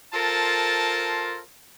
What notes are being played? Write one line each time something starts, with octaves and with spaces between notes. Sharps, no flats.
F4 A4 A#4 C5 A5